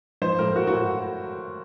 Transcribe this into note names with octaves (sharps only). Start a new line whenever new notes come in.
F3 C5
A2 A#4
A#3 F#4
F#4
A2